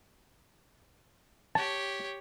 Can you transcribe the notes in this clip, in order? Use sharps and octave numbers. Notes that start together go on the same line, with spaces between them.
G4 C#5 A5